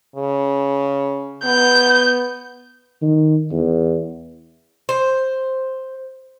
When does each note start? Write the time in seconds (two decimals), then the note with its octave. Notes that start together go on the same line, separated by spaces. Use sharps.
0.16 C#3
1.45 B3 G6
3.02 D#3
3.52 E2
4.89 C5